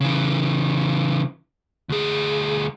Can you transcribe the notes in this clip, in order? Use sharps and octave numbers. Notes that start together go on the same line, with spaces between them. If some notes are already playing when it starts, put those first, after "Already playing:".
C#3 E3
D2 G#4